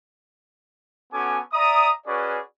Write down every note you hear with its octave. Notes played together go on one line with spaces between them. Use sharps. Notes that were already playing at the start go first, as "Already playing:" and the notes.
B3 C#4 F#4 A4 G#5 D6
D5 E5 A#5 D#6
C#4 F#4 G#4 B4 D5